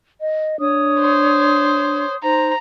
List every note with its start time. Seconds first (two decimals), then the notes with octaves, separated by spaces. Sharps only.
0.21 D#5
0.60 D4 C#5 D#6
1.00 C5
2.23 D#4 C5 A#5